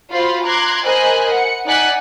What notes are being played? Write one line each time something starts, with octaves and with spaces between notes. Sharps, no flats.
F4 F#4 C5 F5 B5 C6
A#5 C6 D6 F#6 G#6
A#4 C5 D#5 G#5 B5 F#6
F#5 C#7
D#4 D5 F#5 G#5 F#6 B6